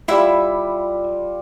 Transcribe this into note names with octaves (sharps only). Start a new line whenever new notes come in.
G3 E4 F4 E5